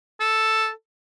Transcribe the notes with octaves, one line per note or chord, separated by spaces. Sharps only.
A4